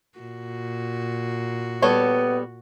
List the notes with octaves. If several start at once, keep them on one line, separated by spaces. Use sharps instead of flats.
A#2 F#4
G3 B3 A4 C#5